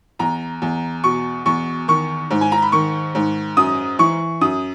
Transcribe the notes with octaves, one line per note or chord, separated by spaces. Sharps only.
E2 A#5
E2
B2 C#6
E2 C#6
D#3 C#6
G#2
G#5
A#5
B5
D#3 C#6
G#2
F#2 D#6
E3 C#6
F#2 D#6